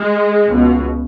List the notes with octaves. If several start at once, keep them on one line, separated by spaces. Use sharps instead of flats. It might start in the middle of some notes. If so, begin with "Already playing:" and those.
Already playing: G#3
C#2 B2